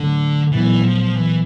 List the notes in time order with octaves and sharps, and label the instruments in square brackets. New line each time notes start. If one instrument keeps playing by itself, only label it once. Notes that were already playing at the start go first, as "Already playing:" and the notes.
Already playing: [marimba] A2 F#3 A3 D4 [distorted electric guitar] D3
[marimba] A#2 F#3 B3 [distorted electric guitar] E3
[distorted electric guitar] F3
E3